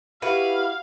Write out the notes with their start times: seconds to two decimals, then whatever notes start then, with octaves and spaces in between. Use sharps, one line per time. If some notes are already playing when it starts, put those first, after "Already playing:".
0.22 E4 F#4 G4 B4 F5